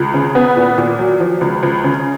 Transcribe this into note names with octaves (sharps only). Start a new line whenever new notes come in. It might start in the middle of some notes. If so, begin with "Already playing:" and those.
Already playing: C#2
C#3
B3
A#2
A#2
F#3
F3
C#2
C#2
C#3